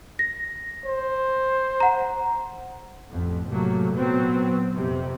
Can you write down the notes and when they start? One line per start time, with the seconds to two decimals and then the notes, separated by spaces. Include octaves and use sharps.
0.19 A#6
0.85 C5
1.80 F#5 A#5
3.10 A1 F2
3.49 A2 C3 F#3 A3 A#3
3.93 A#2 F#3 B3 C4
4.77 F2 C3